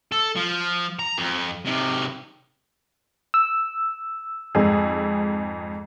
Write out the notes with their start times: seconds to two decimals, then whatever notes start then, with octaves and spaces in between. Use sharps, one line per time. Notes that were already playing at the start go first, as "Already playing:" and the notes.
0.12 A4
0.36 F3
0.99 A#5
1.18 F2
1.65 C3 D#3
3.34 E6
4.55 F2 G#2 G#4